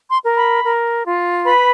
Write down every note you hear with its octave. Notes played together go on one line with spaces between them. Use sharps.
C6
A#4
B5
A#4
F4
B4 B5